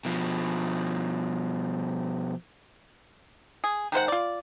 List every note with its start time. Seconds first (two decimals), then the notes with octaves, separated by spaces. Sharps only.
0.05 B2 F3
3.64 G#4
3.92 D#3 G#3 C5 F#5
4.08 F4 D5